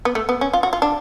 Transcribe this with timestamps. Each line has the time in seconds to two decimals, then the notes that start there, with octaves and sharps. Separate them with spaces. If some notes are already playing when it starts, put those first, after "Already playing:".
0.05 B3
0.15 A3
0.29 B3
0.41 C#4
0.53 F4
0.63 F#4
0.73 F4
0.82 D4